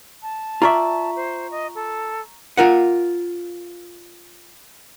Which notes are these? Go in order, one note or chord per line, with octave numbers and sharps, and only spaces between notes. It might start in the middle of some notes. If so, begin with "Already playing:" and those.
A5
F4 D5 E5 A#5 C#6
C5
D#5
A4
F4 A#4 F#5